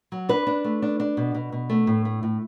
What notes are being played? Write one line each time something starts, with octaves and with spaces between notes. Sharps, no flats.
F#3
D4 B4
D4
A3
D4
D4
B2
B2
B2
A3
A2
A3
A2